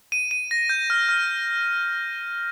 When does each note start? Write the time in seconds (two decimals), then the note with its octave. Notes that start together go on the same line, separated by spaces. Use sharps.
0.12 D#7
0.31 D#7
0.51 A#6
0.69 G6
0.90 F6
1.09 F6